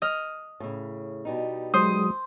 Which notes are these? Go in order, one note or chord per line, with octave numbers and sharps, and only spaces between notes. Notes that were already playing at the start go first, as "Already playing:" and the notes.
D#5 F6
A2 C#3
B2 G3 D#4
F#3 G#3 C5 D#6